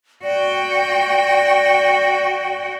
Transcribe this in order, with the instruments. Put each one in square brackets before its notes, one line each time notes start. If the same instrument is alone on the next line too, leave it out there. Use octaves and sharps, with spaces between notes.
[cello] F#4 G5 [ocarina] D5